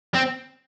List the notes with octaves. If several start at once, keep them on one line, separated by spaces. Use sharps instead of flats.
C4